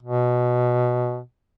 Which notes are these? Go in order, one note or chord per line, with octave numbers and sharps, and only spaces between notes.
B2